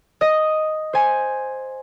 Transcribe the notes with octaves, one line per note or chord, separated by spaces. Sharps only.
D#5
C5 G#5